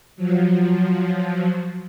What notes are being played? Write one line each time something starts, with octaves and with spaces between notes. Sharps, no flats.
F3 F#3